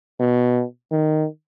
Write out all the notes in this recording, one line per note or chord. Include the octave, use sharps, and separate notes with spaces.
B2
D#3